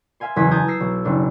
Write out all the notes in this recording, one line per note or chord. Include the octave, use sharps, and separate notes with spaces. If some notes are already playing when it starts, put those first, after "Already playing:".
E5 F5 G#5 C6
F#1 E2 D#6 G#6 B6
A5 A#5 D#6 G6 G#6
E6 A#6 C7
B1
F#1 D4